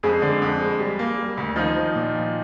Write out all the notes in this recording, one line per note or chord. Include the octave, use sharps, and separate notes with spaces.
F2 G#3 G#4
D3
F2
G#3
G3
A#3
G3
D2
D#3 F3 D#4
F3
A#2
F3